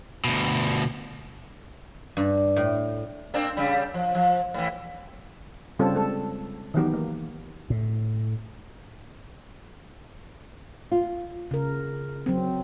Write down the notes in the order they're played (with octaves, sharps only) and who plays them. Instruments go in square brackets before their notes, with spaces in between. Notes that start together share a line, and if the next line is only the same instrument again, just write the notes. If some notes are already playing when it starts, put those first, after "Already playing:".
[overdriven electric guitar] D2 B2
[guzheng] G2
A2
[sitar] A#3 C4 D4
C#3 G3
F3
F3
A2 E3
[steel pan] C#3 G3 C4 F4 A4 C#5
G#3 A4
D#3 E3 F#3 B3 G4
A#3
[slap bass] A2
[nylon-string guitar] F4
[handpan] C#3 A#4
F#3 C4